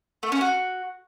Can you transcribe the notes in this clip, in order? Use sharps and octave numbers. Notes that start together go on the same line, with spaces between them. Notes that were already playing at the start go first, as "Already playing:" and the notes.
A3
C#4
F#4